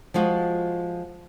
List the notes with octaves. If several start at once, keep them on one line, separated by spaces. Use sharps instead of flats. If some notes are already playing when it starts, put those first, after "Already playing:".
F3 G#3 F4 F#4